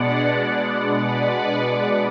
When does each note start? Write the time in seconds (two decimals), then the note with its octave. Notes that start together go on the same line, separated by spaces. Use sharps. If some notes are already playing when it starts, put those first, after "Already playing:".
Already playing: B2 G#3 B3 D4 D5 F#5
0.98 B4 D5